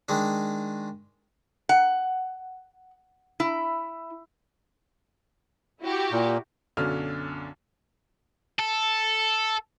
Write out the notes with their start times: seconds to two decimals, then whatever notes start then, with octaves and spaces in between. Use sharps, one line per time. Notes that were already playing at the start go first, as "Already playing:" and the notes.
0.09 D#3 G#3 D4
1.69 F#5
3.40 E4
5.81 E4 F#4 G4
6.12 A#2
6.77 B1 F#2 D3 C#4 F6
8.59 A4